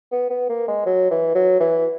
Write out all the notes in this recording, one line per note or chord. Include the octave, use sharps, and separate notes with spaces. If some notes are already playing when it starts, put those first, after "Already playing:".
B3
B3
A#3
G#3
F#3
E3
F#3
E3